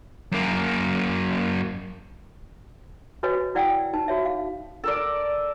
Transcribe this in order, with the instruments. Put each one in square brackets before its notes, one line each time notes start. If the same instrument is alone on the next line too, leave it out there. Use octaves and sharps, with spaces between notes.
[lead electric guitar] F#2 A#3
[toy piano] F#4 B4 C#5 D#5 G#5
E4 D5 F#5 G5 E6
D#4 A5
F#4 C#5 E5
F5
[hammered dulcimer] A4 A#4 D5